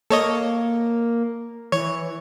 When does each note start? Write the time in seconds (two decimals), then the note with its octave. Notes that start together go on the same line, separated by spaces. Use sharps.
0.11 A#3 A4 C#5 D#5
1.72 E3 C#5